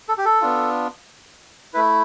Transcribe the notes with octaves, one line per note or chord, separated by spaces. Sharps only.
A4
G4
A4
B3 D4 F4
A3 E4 B4